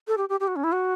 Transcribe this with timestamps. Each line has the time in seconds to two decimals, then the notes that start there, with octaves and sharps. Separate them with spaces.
0.08 A4
0.17 G4
0.29 G4
0.40 G4
0.47 F#4
0.56 C#4
0.64 E4
0.72 F#4